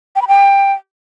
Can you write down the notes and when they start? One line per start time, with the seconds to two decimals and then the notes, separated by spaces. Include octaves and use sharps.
0.16 G5
0.22 B5
0.28 G5